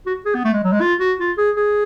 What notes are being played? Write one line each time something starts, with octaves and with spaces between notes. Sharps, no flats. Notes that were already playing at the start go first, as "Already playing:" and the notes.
F#4
G#4
B3
A3
G#3
F#3
G#3
F4
F#4
F4
G#4
G#4